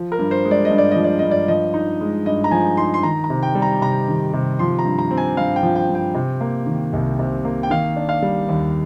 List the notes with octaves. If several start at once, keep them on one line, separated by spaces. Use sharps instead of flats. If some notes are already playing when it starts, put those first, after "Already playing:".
Already playing: F3
A#4
G2
C5
G#3
D5
D#5
G2
D5
F3 D#5
D5
G2 D#5
D5
F3 D#5
D#4
G#3
G2 D#5
A#5
F3 G#5
D#4 C6
C6
D#3 A#5
A#5
C3
G5
G3
A#5
C3 A#5
D#3
C3
F3 C6
A#5
G2
A#5
C4
G#5
G2 F5
G5
F3
G5
G2
G5
C3
A#3
D#3
C2
C3
A#3
G5
D#3 F5
D4
F5
G3
D#2